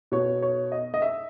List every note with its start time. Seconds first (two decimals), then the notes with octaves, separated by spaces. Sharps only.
0.12 B2 C#5
0.42 C#5
0.72 D#5
0.94 D#5
1.02 E5